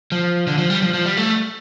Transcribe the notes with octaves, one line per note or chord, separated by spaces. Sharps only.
F3
D3
F3
G3
F3
F3
G3
A3